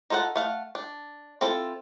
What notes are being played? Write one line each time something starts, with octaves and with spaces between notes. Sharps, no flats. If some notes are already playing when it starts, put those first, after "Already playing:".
D#4 F4 A4 B4 F#5
A3 F5 F#5
D4
C4 E4 F4 A4